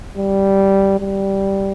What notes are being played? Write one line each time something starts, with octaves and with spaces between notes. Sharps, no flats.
G3
G3